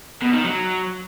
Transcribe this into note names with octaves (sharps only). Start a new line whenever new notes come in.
B2
D#3
F#3